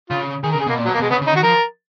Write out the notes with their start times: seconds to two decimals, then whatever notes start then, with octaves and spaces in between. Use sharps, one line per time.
0.10 C#3 F4
0.43 D#3 G#4
0.52 C#3 A#4
0.61 G#4
0.67 B2 A#3
0.78 A#2
0.85 F#3
0.88 B2
0.94 A#3
1.00 B2 G#3
1.10 C#3 B3
1.22 C#3
1.27 D#4
1.32 D#3 F#4
1.43 F3 A#4